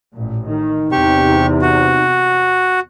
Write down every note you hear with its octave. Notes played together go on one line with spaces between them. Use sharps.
A1 A#2
D#3 D#4
E2 C3 G4 C#6
F#4